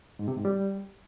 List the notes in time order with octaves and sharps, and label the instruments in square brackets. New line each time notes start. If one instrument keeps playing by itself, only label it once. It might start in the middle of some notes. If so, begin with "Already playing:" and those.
[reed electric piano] G#2
C3
G#2
G3